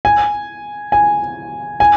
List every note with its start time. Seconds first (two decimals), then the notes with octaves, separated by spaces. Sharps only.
0.05 G#5
0.92 G#5
1.80 G#5